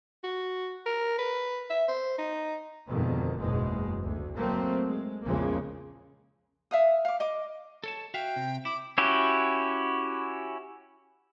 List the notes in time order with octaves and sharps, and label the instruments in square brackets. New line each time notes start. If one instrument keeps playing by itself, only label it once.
[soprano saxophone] F#4
A#4
B4
E5
C5
D#4
[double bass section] F2 G#2 B2 D3 D#3
F#1 E2 G#2 B2 G#3
D2
F#3 A3 A#3 C4
G#3
A#1 E2 C#3 F3 G#3 A#3
[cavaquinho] E5 F5 D#6
F5 D6
D#5 D6
[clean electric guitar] A4 C#5 A5
[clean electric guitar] F#4 E5 F5 [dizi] G5
[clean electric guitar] C3
[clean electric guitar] E4 [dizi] D6
[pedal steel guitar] C#4 E4 F#4 G4